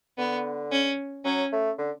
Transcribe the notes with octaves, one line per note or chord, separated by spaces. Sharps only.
D3 B3
C#4
F#3 C#4
A3
D3